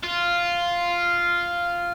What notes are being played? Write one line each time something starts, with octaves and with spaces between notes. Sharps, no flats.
F4